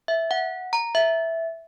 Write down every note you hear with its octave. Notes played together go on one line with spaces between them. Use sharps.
E5
F#5
A#5
E5